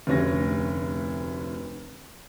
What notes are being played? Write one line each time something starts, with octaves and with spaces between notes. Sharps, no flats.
F1 D2 C#4 A#6